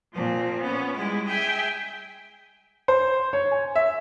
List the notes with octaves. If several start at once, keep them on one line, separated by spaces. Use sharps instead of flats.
A#2 F3 C4
B3 C#4
G3 G#3 E4
G#4 E5 G5 G#5
C5
C#5
G#5
E5